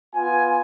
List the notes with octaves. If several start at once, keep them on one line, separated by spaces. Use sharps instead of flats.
B3 F4 G#5